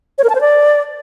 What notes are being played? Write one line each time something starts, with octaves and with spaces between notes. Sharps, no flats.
C#5
A#4
A5
C5
D5